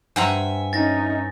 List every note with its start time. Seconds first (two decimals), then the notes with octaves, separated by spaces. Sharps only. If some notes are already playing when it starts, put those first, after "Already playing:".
0.16 G2 C5 E5 F#5 G#5 A#5
0.73 C#4 D#4 A6 A#6